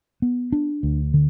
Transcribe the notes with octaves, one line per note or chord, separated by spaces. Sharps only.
B3
D4
D2
D3